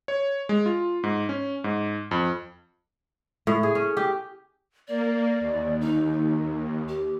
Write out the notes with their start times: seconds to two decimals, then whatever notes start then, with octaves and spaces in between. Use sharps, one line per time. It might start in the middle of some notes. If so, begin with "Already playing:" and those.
0.08 C#5
0.49 G#3
0.66 F4
1.03 G#2
1.29 C#4
1.64 G#2
2.11 F2
3.47 A2
3.63 G#4
3.75 C#4
3.97 G4
4.88 A#3 D5
5.40 D#2
5.81 D#4
6.89 G4